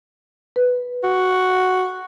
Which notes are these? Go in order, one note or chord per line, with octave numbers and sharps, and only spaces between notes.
B4
F#4